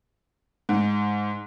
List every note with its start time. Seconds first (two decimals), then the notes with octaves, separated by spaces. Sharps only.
0.69 G#2